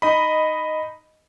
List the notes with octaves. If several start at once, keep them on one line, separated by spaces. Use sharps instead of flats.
D#4 D#5 B5